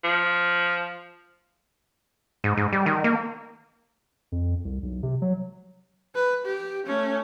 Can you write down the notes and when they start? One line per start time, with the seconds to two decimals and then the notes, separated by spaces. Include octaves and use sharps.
0.04 F3
2.44 G#2
2.57 G#2
2.73 G3
2.86 D#3
3.04 A#3
4.32 F2
4.65 C2
4.83 B1
5.03 C3
5.22 F#3
6.15 B4
6.45 G4
6.86 A3 C#4